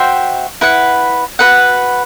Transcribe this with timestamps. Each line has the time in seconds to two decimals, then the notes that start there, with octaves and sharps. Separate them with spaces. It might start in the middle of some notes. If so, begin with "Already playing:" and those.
Already playing: F#4 C5 E5 G5
0.61 E4 B4 F#5
1.39 F#4 B4 F#5